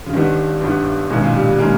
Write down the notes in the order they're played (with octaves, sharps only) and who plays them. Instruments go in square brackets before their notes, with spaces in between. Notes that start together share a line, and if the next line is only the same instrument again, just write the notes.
[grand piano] C#3
[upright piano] G1 G2 G3 B3 [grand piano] D#3
[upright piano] G1 G2 G3 B3
[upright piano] G#1 G2 D#3 G#3 C#4 [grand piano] B2
[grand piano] A#2
G3
G3
[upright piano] D#3 G#3 C#4 [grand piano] A#3